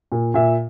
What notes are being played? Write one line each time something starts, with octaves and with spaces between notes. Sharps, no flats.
A#2
A#2 E5